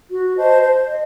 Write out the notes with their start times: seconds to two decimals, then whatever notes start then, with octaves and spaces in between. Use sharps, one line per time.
0.10 F#4
0.37 C5 D#5 A5
0.63 C5
0.89 D#5